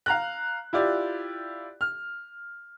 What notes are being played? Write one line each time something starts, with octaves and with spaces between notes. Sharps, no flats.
F5 A#5 F#6
E4 F4 G4 D5
F6